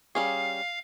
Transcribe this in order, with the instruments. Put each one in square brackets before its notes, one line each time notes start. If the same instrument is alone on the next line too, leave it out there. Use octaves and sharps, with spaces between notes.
[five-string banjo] G3 C#4 G#4 [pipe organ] F5